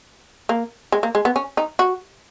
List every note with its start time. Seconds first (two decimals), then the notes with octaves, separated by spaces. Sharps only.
0.49 A#3
0.92 G#3
1.03 A#3
1.15 G#3
1.25 B3
1.36 C#4
1.57 D#4
1.79 F#4